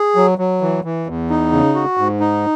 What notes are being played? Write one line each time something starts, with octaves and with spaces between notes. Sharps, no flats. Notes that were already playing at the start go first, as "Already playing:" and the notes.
Already playing: G#4
F#3
F#3
E3
E3
E2
D#4
C#3
F#4
G#2
D#4